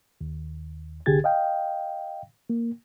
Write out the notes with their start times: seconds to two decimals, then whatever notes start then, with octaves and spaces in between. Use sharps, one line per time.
0.21 D#2
1.06 C2 D3 G4 G#4 G#6 A6
1.24 D#5 F5 G5
2.50 A#3